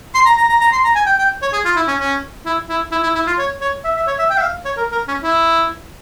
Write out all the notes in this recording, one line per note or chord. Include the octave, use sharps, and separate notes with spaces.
C6
A#5
A#5
A#5
A#5
C6
A#5
G#5
G5
G5
C#5
G#4
F4
E4
C#4
C#4
E4
E4
E4
E4
E4
F4
C#5
C#5
E5
E5
C#5
E5
G5
E5
F5
C#5
A#4
A#4
C#4
E4